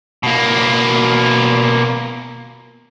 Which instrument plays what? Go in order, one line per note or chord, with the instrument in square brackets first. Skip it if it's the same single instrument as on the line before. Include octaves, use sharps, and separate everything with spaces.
[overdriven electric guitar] B2 A#3